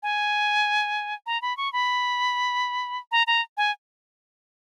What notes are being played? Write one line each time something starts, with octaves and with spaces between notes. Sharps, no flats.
G#5
A#5
B5
C#6
B5
A#5
A#5
G#5